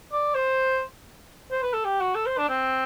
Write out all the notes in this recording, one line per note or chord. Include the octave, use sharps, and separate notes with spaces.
D5
C5
C5
B4
A4
G4
F#4
A4
C5
D4
C4